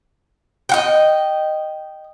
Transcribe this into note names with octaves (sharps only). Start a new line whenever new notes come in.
D#5 F#5 G5